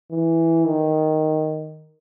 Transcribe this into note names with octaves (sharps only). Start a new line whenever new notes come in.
E3
D#3